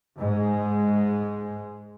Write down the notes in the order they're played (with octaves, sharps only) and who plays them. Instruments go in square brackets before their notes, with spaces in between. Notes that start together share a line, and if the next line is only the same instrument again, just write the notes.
[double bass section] G#2 G#3